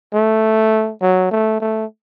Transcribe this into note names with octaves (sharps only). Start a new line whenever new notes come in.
A3
F#3
A3
A3